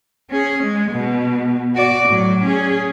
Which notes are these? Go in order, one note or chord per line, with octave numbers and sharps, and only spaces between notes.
C#4 G#4
G#3
B2
F#4 D5
A2 F#3
C#4 G#4